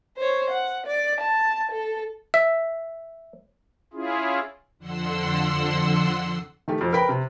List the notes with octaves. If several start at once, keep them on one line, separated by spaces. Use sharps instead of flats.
C5 C#5
F#5
D5
A5
A4
E5
C#4 E4 F4 G#4
F2 D3 F#5 C6 E6
D#3 A3 G4
F2
A#4 B4 G5 B5
C3